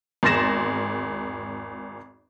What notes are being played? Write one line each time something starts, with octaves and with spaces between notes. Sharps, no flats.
G#1 E2 C6 A6 A#6 E7